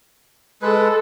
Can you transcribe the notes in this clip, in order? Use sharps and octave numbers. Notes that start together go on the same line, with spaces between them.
G#3 A4 B4